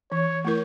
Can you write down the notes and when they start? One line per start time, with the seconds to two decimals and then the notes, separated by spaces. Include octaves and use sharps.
0.12 E3 C#5
0.45 A3 E4 A#4